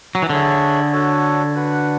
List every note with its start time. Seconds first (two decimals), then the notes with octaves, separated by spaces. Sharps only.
0.15 F#3
0.22 E3
0.30 D3 D4 G#4 C#5 E5
0.92 D4 F#4 A4 C#5
1.54 D4 F#4 B4 F#5